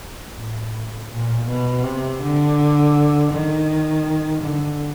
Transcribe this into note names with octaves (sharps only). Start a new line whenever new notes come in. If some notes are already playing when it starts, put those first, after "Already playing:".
A2
A#2
B2
C3
D3
D#3
D3